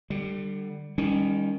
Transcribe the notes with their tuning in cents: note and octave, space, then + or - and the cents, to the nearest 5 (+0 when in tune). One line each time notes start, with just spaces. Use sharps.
D3 +30 G3 +0
D#3 +0 G3 +35 C#4 +5